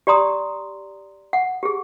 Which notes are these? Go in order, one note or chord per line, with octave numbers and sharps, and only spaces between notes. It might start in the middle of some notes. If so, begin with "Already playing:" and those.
G4 D5 A#5 C6 D#6
F#5
G4 G#4